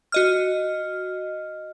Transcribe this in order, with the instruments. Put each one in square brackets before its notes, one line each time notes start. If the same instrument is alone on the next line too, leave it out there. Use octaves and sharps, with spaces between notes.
[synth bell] F#4 D#5 F6